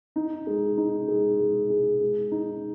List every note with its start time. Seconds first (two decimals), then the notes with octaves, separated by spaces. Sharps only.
0.16 D#4
0.47 G#3
0.77 D#4
1.08 G#3
1.39 G#3
1.70 G#4
2.01 G#3
2.32 D#4